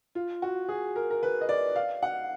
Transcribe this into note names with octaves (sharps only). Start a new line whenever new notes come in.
F4
F#4
G#4
A#4
A#4
B4
D#5
D5
F5
F#5